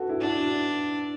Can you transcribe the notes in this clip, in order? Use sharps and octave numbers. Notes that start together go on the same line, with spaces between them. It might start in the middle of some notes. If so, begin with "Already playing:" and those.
Already playing: F#4 A4 B4
E4
D4 F#4